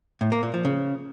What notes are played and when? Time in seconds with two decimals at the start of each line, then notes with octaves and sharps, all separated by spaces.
0.21 A2
0.32 A#3
0.43 A#2
0.54 F3
0.65 C#3